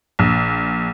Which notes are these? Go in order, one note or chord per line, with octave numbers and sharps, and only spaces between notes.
A#1